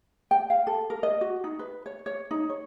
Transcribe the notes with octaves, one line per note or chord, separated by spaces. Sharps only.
G5
F5
A4
A#4
D#5
F#4
D#4
B4
C#5
C#5
D#4
C#5